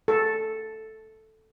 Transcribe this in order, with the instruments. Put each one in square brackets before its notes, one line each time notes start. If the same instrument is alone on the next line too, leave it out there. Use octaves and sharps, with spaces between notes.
[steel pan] A4